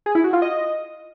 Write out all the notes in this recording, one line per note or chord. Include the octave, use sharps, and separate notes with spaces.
G#4
E4
F#4
F4
D#5